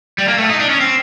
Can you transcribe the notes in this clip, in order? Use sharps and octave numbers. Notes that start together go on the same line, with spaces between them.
G3
A#3
A3
D#4
D4
C#4
C4